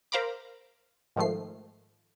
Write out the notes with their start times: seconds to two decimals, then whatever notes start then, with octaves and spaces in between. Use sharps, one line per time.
0.12 A#4 C5 F5 A#5 B5 D6
1.16 G#2 D#3 F3 A3 C7